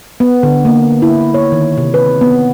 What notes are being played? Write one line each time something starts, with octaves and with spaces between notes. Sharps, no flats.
B3
D3
A#3
E4
C#5
D#3
C3
B4
B3